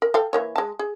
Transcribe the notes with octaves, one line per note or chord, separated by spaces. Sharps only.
A#4
A4 F5 G5
E3 A#3 C#5
G#3 A5
G#4